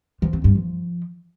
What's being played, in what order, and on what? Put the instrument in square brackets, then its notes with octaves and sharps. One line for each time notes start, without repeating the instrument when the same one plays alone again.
[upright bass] F3
C4
G2
F3